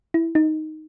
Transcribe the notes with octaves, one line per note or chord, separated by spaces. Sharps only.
E4
D#4